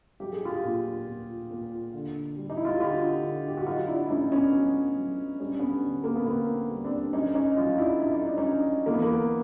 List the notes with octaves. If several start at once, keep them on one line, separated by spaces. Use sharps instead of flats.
F#3 G4
G#4
F4 G4
A#2
A#2
A#2
D3
G3
D#4
E4
F4
F#4
D3 F4 G4
D3
G4
F#4
F#3 D#4 F4
D4 E4
E4
A2 C#4 D#4
B3 C#4
F#3
F#3
G3 C#4
D4
B3 C#4
D3
A#3
B3
D3 A#3 C4
G3
C4 D4
F#3 C#4 D#4
C#4 D#4
F#3 D#4 F4
D4 E4
F#3 E4
D#4
D4
C#4 D#4
F#3
E3 A#3
B3
A#3